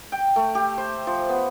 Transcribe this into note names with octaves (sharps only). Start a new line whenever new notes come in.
G5
A3
G4
C5
F3
B3